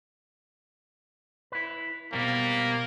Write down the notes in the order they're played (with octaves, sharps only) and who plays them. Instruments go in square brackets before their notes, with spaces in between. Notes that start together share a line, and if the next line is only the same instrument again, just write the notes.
[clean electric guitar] E4 B4
[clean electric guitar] B2 G3 C4 [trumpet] A#3